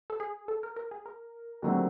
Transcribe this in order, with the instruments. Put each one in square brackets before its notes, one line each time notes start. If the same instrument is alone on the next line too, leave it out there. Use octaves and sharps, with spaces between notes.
[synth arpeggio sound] A4
G#4
A4
A#4
A#4
G#4
A#4
[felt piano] D#2 D3 F#3 A3 C4